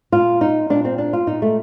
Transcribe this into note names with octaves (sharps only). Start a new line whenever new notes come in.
A#2 F4
D#4
A#2 D4
C4
D4
F4
A#2 D#4
A3